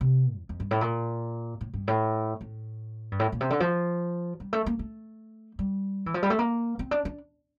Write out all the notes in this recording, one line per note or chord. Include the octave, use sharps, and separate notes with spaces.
C3
E2
F2
G2
A2
A#2
A2
G2
A2
A2
G2
A2
A#2
C3
D3
F3
G3
A3
A#3
A3
G3
E3
F3
G3
A3
A#3
C4
D4
D4